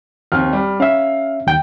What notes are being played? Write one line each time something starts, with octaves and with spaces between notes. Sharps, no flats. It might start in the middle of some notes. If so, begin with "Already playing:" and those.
D#2 C4 F6
G3
C#4 E5 F5
D#2 G5